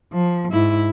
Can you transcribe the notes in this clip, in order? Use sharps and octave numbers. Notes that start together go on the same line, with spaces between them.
F3
G#2 E4